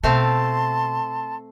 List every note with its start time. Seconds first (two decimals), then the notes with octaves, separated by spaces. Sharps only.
0.04 B2 A3 C4 F5 A5 C6